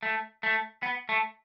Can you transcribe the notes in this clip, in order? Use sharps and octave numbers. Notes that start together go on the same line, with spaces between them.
A3
A3
B3
A3